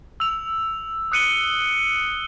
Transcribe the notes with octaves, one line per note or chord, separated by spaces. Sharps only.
E6 F7
D#6 F#6 C#7 D#7 F#7 G7